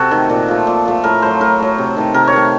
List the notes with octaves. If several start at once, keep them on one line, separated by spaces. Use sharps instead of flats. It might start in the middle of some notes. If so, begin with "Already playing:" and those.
Already playing: C3 F#4 A4
D#3 A3
A#2
F3 A3
A#2
F3 A3
A2 A#4
F#3 A3 C5
A2 A#4
F#3 A3
C3
D#3 A3
C3 A#4
C#5
D#3 A3